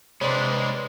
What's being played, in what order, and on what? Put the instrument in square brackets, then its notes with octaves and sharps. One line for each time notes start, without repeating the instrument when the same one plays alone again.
[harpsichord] C3 [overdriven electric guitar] G#3 D4 [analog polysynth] B4 D5 B5 [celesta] C#5 C6